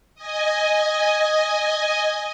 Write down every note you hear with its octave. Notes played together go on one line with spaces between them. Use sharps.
D#5 G#5